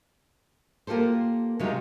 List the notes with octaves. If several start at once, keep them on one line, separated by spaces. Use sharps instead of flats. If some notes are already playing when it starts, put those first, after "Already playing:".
A#3 F4 G4 A4 C5
C3 F#3 G#3 D#4 F4 G4